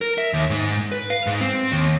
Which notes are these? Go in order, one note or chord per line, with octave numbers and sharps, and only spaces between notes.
A#4
E5
D#2
G#2
B4
F5
G#2
C4
D#2